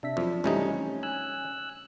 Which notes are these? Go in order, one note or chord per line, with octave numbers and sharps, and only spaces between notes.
C3 D4 E5 B6
F2 F3 F#3 C4
C#2 C3 E3 G3 A3 C#4 D#4
G#5 E6 F#6